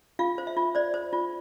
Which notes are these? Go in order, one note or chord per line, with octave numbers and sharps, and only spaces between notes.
F4 F5
C5
E5
F4
C5 D5
C5
F4